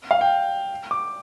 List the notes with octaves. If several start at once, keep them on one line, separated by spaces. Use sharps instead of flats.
F5
G5
D6